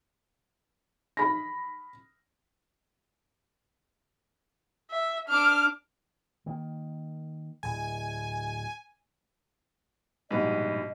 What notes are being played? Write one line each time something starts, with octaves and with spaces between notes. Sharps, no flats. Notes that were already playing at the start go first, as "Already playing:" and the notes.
B5 A#6
E5
D4 D6 F6
D#3 A#3
D1 G#5
A#1 G#2 B2 G3 B4 D#5